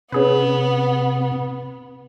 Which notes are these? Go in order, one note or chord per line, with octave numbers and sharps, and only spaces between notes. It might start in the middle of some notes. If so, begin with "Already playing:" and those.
C3 B3 C#4 G#4 B4